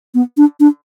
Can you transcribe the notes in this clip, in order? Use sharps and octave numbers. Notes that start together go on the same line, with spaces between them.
B3
D4
D4